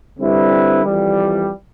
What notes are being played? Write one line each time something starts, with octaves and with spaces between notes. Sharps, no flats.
D3 G3 C4 E4 B4
F2 E3 G3